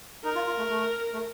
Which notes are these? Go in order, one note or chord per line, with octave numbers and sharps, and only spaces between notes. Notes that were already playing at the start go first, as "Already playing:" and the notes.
D#4 A#4
F4
F4
A3
A3
A3